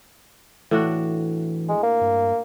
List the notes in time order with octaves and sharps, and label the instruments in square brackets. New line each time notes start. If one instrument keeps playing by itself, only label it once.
[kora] A2 D4 F#4 [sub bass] E3
[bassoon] G#3
A#3
[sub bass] G2